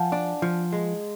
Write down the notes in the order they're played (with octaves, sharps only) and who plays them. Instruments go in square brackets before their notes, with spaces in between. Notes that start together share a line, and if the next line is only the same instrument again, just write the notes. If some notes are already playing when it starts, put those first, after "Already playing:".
Already playing: [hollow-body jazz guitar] F3 [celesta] F5 F#5 G#5 A5
[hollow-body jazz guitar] D4
F3
G#3